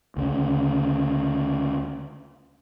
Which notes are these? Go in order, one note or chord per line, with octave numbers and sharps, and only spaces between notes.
D2 C#3